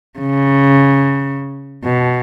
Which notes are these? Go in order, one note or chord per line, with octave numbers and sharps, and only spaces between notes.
C#3
B2